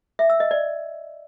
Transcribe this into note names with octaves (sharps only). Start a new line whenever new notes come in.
E5
E6
D#5
D5